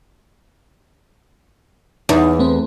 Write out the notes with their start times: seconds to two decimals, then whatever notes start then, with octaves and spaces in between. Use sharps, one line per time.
2.09 E2 D#4
2.39 A3 C4 B4